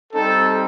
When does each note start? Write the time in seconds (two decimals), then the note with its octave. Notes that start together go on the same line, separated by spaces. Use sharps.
0.13 G3 C4 D#4 A4